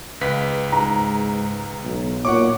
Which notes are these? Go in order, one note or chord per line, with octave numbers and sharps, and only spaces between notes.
C#2 B4 B6
G#2 A#5
B1
A#2 C#5 F#5 C#6 D6